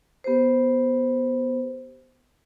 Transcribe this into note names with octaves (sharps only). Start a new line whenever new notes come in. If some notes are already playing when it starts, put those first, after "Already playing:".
B3 G4 B4 C5